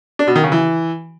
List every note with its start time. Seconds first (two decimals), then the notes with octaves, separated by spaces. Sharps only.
0.19 D4
0.27 B2
0.36 D#3
0.44 C#3
0.52 E3